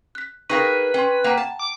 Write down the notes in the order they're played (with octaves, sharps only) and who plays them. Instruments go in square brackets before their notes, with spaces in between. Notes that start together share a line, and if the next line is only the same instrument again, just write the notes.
[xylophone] F#6 B6
[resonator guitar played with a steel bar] D#4 G#4 A#4 [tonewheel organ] B4 [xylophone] F5 G5 C#6
[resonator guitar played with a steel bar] C#4 [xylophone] G5 C6
[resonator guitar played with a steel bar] A#3 [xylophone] F#5 G5 A#5
[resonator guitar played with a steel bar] A5
[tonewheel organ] D6